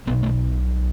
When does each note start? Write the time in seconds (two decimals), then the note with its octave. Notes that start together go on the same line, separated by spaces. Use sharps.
0.07 B1 B3
0.10 B2
0.23 A3